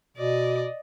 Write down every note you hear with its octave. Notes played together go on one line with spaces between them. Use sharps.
B2 D5 D#5